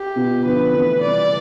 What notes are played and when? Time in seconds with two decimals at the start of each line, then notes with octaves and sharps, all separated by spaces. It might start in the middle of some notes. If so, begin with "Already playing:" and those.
Already playing: G4
0.16 B2 B3 F4
0.44 D3 F3 B3 D4 F4 B4
0.73 E3 A3 C4 E4
1.01 C3 E3 G3 D5